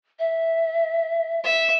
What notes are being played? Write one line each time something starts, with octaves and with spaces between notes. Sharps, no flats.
E5
E5